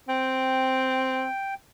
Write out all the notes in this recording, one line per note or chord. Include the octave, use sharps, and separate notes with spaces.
C4 G5